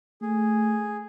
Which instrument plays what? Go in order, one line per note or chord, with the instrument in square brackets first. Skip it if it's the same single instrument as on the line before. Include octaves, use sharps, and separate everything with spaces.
[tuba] A3 [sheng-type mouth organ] G#4